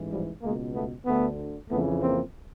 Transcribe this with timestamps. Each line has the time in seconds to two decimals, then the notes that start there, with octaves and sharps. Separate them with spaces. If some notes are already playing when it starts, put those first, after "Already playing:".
Already playing: A1 G#2 E3
0.11 F3 G3
0.42 C#2 B2 G#3 A#3
0.74 A3 B3
1.06 D2 D3 A3 B3
1.69 F2 C#3 E3 A3 B3
2.02 A#3 C4